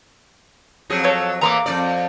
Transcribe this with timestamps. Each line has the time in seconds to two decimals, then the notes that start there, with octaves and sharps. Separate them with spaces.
0.90 F2 F#3 G#4
1.04 A4 C#5
1.41 A2 E3 A#3 A#5 C6 D6
1.66 F2 D3 D5